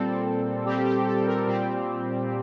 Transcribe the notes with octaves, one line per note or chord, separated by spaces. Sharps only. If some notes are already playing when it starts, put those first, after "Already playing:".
Already playing: A#2 G3 C4 A4
A#2 G3 C4 G4
G4
A4
A#4
A#2 G3 C4 G4